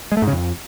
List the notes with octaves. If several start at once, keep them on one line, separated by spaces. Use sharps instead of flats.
G#3
A3
G#2
C#3
F2